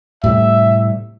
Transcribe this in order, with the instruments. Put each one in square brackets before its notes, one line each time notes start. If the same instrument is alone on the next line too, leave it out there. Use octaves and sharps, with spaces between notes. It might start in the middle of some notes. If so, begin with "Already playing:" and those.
[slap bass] A2 C3 G3 [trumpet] E5